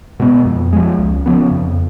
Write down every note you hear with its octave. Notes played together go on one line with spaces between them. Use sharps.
B2 G#3 B3
F2
F3 G#3
C#2
C#3 F3 B3
F2